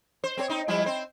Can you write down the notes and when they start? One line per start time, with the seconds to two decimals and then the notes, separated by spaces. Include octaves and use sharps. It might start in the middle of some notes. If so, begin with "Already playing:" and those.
0.24 C5
0.38 C4 G#4 C#5
0.50 C4 D#4
0.68 F3 G3 E4
0.86 C4 C5